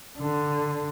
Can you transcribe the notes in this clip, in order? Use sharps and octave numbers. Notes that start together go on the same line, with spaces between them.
D3